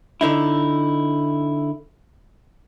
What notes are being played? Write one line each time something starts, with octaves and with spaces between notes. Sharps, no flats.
D3 D#4 E4